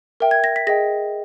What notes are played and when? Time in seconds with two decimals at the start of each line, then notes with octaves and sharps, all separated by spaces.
0.20 A#4 E5 G5
0.31 G#6
0.44 A#6
0.56 B6
0.67 G#4 D#5 G5 A#6